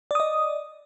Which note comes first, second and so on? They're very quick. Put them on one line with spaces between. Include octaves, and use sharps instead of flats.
D5 D#6 D#5